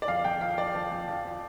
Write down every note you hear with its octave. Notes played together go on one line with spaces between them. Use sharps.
D5
F2 F5
F2 G5
F3 F5
F3 D5
F3
F2
F3
F3